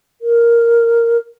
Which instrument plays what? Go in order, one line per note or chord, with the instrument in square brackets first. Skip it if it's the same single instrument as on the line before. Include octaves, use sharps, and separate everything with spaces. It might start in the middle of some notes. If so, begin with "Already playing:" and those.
[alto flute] A#4